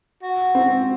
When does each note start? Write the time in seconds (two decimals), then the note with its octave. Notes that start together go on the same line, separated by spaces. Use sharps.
0.23 F#4
0.55 C4